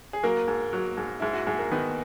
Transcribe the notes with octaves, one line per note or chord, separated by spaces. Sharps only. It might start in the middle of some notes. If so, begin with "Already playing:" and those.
G#4
F#3 A#3 A#4
G#2
F#3
G#2
G#2 E4
F#4
G#2 G#4
A#4
D#3 B3 B4